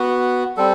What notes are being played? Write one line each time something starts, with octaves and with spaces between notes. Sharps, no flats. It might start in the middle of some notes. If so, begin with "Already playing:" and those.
Already playing: B3 F#4
G3 C4 A4